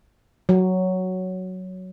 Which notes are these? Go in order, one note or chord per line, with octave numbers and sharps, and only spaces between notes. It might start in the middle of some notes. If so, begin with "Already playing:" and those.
F#3